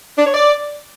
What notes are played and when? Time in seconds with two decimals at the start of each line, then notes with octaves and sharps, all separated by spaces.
0.18 D4
0.26 C#5
0.34 D5